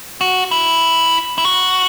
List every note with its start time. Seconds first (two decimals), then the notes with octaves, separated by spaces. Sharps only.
0.21 F#4
0.51 E4
1.38 E4
1.45 F#4